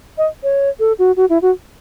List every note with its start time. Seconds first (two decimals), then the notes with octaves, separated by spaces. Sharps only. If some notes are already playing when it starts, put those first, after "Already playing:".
0.18 D#5
0.43 C#5
0.80 A4
0.99 F#4
1.16 F#4
1.29 E4
1.42 F#4